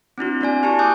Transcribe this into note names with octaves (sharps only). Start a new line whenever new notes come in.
C4 D4 E4 F#4
A#3 F#4 D5 G#5
E4 G4 A5 C#6
G#5 D6 D#6 F#6 G6